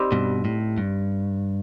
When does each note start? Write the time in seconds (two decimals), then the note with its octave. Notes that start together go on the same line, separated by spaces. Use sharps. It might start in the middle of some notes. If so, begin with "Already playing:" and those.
Already playing: G3 C4 D#4
0.12 G2 B2
0.45 A2
0.78 G2